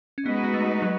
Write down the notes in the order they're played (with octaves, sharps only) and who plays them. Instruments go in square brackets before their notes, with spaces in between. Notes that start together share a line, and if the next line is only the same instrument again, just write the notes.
[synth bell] C#4
[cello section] G#3 D#4 F#4 B4 [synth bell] B3
[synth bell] B3
A3
F#3